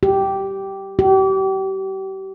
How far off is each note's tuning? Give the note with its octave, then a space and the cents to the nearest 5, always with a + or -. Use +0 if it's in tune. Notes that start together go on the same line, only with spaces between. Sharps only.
G4 -10
G4 -35